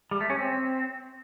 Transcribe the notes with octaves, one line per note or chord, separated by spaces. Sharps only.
G3
A3
C#4
C4